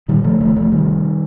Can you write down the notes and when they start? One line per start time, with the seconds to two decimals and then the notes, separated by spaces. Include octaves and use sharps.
0.08 A#2 D#3 G3
0.24 D3 F3 A3
0.40 F1 F3 A3
0.56 C2 F3 A3
0.72 C3 D#3 G3
0.87 F1